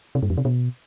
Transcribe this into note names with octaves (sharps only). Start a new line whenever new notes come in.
C3
G2
F2
C3
B2